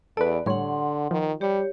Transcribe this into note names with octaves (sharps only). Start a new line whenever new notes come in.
E2 A4 B4 D5
A2 D3 G3 C#5 F#5 C6
D#3 F3
G3 G4 C#5